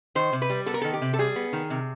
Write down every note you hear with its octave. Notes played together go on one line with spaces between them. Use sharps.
D#3 C5
C3
B4
G3
B3 A4
A#4
D#3 A4
G4
C3
A4
G3 G#4
B3
D#3
C3